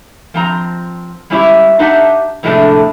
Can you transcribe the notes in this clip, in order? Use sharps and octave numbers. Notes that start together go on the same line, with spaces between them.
F3 C4 A#5
G3 G#3 C#4 E4 G4
D4 D#4 G4 E5 F#5 A5
F2 A2 C3 G#3 A3 D4